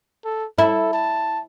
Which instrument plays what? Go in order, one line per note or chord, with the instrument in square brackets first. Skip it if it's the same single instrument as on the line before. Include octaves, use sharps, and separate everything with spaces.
[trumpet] A4
[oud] E4 [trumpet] A4
[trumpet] A5